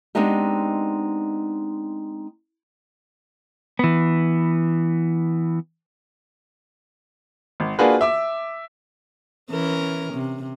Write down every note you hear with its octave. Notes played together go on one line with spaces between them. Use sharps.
G#3 B3 C4 D4 D#4 G4
E3 B3
G#1
A#3 D4 F4 F#4 G#4 B4
E5 D6 E6
E3 C#4 A#4
C3